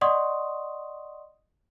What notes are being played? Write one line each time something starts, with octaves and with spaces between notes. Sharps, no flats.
D5 D#5 F#5 C6 C#6 D#6